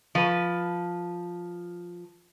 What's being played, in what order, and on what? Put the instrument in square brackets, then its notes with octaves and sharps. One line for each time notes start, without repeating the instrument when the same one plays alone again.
[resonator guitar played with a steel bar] F3 B4